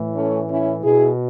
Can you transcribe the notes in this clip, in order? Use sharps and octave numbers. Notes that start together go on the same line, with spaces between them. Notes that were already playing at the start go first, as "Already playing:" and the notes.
Already playing: A2 E3
A3 C#4
C#4 E4
B2 E4 G#4